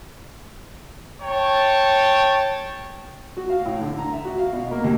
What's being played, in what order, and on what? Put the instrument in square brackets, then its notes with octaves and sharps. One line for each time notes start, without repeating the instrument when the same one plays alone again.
[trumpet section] C#5 G5 A5
[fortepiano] F#4
F5
A2
D3
A#5
E5
F#4
F5
B2
A#3
D#2